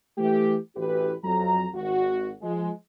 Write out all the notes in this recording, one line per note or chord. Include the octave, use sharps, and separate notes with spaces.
E3 A3 G4
A1 E3 F#4 G4 B4
F2 F#3 A#5
G#1 F#4
F3 G#3